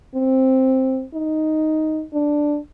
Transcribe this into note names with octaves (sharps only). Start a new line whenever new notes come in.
C4
D#4
D4